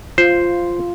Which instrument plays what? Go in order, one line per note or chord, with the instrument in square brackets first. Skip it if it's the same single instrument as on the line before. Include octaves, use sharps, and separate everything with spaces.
[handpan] F4 [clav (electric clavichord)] C5